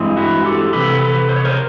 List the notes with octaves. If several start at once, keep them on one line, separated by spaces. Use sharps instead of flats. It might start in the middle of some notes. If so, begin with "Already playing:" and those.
Already playing: G2 E3 G#3 C4
E4 F#4
G4 A4
C3 E3 A4 B4
A4 B4
C5
C#5
A#4 C5